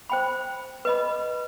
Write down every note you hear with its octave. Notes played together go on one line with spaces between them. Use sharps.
C5 G5 B5
B4 D#5 B5